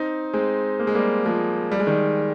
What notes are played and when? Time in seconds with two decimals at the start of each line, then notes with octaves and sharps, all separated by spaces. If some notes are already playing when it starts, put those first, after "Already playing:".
Already playing: C4 D#4
0.33 G#3 C4
0.80 A#3
0.87 G#3
0.95 G3 A#3
1.26 F3 G#3
1.72 G3
1.79 G#3
1.87 D#3 G3